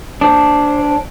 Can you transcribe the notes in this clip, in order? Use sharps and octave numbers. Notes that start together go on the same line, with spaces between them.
D4 C5